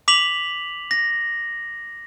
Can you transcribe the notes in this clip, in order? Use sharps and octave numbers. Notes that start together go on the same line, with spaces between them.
D6 B6 F7 F#7
A#6